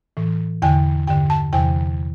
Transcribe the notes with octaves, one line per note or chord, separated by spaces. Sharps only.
A2 E3
E2 D3 G5
G2 D3 G5
A5
E2 C3 E3 G5